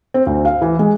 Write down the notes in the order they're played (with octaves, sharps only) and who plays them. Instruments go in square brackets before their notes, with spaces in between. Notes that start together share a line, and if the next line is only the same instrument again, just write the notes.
[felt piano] C4
D2
F5
E3
G#3